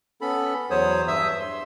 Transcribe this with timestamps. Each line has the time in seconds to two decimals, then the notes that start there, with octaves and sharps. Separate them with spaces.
0.21 B3 C#4 A4 B5
0.70 E2 F#3 C5 C#5 D#6
1.08 G2 E5 D#6 E6
1.40 C6